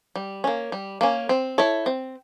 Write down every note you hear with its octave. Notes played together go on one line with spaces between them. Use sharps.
G3
A#3 C#4
G3
A#3 C#4
C4
E4 A4 C#5
C4